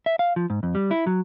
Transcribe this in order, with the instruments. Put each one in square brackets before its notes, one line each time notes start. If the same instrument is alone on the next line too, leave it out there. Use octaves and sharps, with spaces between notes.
[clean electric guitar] E5
F5
F3
G#2
F2
G3
E4
F#3